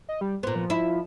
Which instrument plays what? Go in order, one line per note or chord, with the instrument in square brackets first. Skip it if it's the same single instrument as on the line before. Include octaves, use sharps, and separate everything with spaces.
[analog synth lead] D#5
G3
[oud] A#2 B3 [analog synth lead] C5
[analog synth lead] F3
[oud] E4